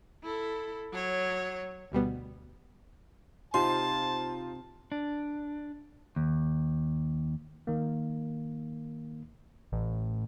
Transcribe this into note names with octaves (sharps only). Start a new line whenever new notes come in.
E4 A4
F#3 C#5
D2 B2 G3 B3
C3 D#4 F4 C5 A5 C6
D4
D#2
D#3 A#3
A1